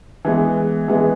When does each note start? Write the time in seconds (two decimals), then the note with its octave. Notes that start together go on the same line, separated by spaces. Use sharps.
0.25 E3 G#3 B3
0.88 E3 G#3 B3